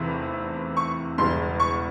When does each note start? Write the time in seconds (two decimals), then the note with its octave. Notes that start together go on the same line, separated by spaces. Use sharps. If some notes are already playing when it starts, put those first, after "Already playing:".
Already playing: F1 E2 C3 E3
0.77 C#6
1.18 E1 E2 C#3 G3 C6
1.60 C#6